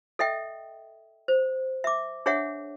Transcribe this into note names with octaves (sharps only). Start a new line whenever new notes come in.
A4 D#5 E5 G5
C5
E5 D6
D4 G#4 C#5 E5 F#5